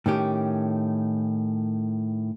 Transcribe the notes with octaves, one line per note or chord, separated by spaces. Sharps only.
A2 D#3 C#4 G4